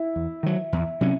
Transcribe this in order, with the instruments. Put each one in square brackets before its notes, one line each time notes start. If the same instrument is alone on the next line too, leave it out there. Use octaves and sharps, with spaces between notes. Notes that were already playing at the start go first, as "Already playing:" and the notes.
Already playing: [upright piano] E4
[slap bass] E2
D#3 F#3
E2
C3 F#3 C#4